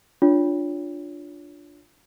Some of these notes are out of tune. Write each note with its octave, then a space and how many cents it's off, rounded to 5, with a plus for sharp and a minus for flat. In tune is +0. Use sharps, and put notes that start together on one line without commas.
D4 +0 F4 +5 C#5 +30